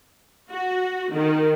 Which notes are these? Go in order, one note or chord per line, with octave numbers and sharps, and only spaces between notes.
F#4
D#3